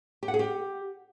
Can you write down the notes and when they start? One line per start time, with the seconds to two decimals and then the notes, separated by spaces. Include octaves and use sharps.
0.23 G4
0.28 F#5
0.34 G#4
0.39 G4